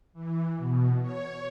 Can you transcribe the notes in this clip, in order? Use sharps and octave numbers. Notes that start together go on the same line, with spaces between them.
E3
B2
C#5